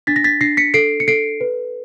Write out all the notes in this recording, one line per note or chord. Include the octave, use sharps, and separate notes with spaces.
D4 A6 B6
A#6
A6 B6
D4 A#6 C7
B6 C#7
A4 C7 D7
C#7
A4 C7 D7
B4